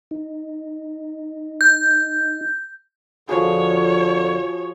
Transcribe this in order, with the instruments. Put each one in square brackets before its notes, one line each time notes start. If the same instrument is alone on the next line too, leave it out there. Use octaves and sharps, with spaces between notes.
[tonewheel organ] D#4
[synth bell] G6
[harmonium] F2 D3 [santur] F3 F#4 G#4 [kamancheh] C#5